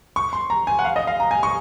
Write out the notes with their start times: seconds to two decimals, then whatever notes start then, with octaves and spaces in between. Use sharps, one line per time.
0.16 C#6
0.33 C6
0.50 A#5
0.67 G#5
0.79 F#5
0.85 F5
0.96 D#5
1.07 F5
1.20 A#5
1.31 G#5
1.43 C#6